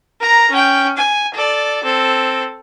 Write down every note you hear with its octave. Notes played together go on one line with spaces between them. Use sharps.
A#4 A#5
C#4 G5
G#5
A4 D5
C4 A4